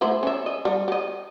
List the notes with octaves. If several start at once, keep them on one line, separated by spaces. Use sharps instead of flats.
A3 E4 C5
C#4 E5
D#5
G3
G4 D#5